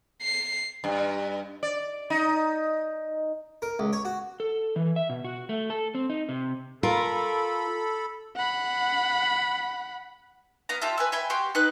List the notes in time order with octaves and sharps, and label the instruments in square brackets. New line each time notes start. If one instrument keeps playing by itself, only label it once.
[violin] C7
[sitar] G2
D5
D#4
[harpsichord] A#4
C#2
C#5
F#4
[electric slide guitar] A4
E3
E5
B2
F#4
A3
A4
C4
D#4
C3
[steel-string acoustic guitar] F4 A#4 [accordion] A4 B5
[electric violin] F#5 B5
[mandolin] B3 F5 A#5
F4 G4 E5 A5
B4 G#5 E6
E5 G5 G#5 B5
F#4 G4 G5 C6
D#4 B4 F#6